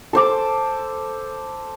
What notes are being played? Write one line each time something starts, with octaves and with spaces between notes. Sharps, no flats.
A4 C5 D6